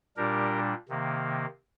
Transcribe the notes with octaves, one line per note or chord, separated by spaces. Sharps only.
A#2 G3 D4 G4 A#4
C3 D#3 A#3